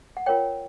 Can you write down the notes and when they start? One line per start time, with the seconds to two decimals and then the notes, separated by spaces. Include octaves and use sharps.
0.17 F#5
0.26 F4 A#4 C#5 G5